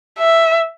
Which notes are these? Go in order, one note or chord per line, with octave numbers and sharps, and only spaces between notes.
E5